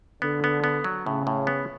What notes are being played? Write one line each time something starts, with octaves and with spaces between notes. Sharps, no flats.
D3 B3
B3
B3
F#3
A2 C#3
A2
B3